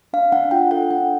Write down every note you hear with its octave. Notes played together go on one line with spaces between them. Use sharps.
D4 F5
D4 F#5
F4 G5
A4 F#5
D4 G5